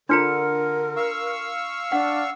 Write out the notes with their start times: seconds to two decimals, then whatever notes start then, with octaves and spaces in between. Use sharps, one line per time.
0.09 D3 D4 F4 A#4 A#5 C6 F6 C#7
0.96 F5 C#6 E6
1.92 D4 F#5